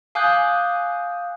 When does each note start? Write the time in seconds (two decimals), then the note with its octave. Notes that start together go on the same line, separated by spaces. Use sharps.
0.15 F5 G#5 D6 D#6 F#6 G6